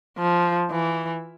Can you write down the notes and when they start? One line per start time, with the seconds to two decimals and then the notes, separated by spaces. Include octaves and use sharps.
0.18 F3
0.71 E3